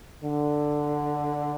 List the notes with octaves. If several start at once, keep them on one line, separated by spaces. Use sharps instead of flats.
D3